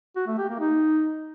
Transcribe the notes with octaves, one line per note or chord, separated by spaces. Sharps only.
F#4
A3
G4
A#3
D#4